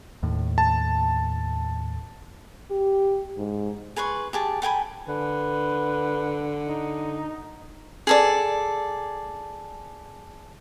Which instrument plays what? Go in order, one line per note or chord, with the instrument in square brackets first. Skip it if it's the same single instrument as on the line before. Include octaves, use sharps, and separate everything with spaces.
[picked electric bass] D#2 A2
[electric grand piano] A5
[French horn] G4
G#2
[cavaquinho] G#4 B4 C6 C#6
G4 G#4 A5
A4 G5 G#5 B5
[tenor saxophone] D3 [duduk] B4
[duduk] D#4
[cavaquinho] G#4 A4 D5